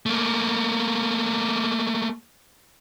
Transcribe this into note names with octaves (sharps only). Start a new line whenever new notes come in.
A3 A#3